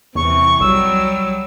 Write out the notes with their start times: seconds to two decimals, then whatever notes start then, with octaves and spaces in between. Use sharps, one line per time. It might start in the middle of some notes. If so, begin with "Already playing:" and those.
0.15 E2 C3 E3 C#6
0.60 C2 F#3 G3 E6